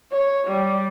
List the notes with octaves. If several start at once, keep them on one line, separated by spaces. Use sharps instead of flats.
C#5
G3